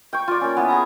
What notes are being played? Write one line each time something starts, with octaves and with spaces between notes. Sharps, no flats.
G5 C#6
F4 D5
A#3 C#4
B3 E4
G#4 G#5 A#5